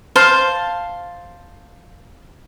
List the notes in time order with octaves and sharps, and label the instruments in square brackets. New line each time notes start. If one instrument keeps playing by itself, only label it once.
[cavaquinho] C5 F5 A5